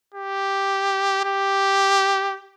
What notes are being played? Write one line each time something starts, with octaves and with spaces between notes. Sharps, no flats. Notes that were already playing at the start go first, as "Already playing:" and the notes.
G4
G4